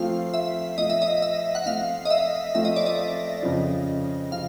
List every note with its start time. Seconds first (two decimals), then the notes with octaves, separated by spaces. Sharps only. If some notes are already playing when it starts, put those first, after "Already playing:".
Already playing: F3 A3 C4 F4 F5
0.34 E5
0.77 F3 A3 C4 F4 D#5
0.90 E5
1.02 D#5
1.22 E5
1.55 F#5
1.66 F3 A3 C4 F4 F5
2.05 D#5
2.10 E5
2.55 F3 A3 C4 F4 E5
2.65 D#5
2.76 D5
2.86 D#5
3.43 F2 C#3 F3
4.32 C#3 F3 F5